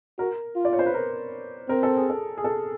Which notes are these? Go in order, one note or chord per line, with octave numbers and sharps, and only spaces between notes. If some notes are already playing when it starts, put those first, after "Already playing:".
F#4 A#4
F4
D5
C#5
C5
B4
A#4
C4 A#4
A4
G#4
A4
G#4
A4